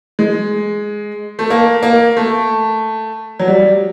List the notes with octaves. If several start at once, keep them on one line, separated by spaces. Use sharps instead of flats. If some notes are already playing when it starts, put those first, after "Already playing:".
G#3
A3
A#3
A#3
A3
F#3
G3